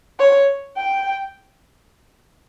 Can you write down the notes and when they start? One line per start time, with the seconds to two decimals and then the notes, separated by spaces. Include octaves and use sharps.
0.19 C#5
0.77 G5